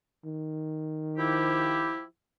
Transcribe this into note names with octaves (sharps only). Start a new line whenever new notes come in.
D#3
F3 E4 G4